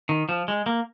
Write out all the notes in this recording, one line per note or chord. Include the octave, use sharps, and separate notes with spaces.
D#3
F3
G#3
A#3